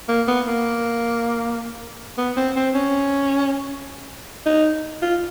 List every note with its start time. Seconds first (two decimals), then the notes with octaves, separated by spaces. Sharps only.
0.09 A#3
0.28 B3
0.47 A#3
2.18 B3
2.37 C4
2.56 C4
2.75 C#4
4.46 D#4
5.02 F4